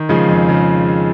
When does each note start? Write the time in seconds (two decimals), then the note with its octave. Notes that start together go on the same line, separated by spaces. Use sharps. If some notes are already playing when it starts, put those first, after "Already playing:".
Already playing: D#3
0.09 C#3 F3 G#3
0.29 F2
0.49 C#3